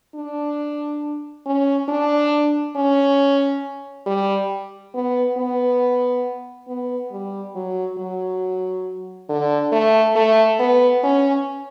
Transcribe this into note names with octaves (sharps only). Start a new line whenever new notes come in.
D4
C#4
D4
C#4
G3
B3
B3
B3
G3
F#3
F#3
D3
A3
A3
B3
C#4